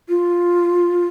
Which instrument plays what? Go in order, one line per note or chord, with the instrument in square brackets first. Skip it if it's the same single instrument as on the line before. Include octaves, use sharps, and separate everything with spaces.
[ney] F4